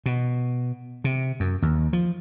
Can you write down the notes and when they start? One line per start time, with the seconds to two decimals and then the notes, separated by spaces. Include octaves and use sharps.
0.06 B2
1.04 C3
1.40 F#2
1.62 D#2
1.93 F3